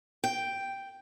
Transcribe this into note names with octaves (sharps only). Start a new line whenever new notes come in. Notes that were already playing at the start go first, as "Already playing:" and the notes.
G5